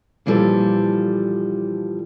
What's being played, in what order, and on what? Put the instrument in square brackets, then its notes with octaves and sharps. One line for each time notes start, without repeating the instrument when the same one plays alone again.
[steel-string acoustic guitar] A#2 E3 F3 G3 A4